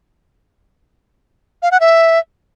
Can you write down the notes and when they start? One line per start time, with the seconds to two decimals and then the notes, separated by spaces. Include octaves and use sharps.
1.63 F5
1.71 F#5
1.80 E5